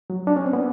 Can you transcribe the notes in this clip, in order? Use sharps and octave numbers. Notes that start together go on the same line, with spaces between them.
F#3
D4
C#4
C4
B3